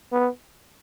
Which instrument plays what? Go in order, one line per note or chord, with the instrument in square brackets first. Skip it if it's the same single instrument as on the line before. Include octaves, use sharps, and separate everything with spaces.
[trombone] B3